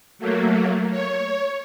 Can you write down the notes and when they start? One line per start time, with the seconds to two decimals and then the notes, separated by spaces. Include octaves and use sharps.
0.19 F#3 A3 A#3
0.90 C#5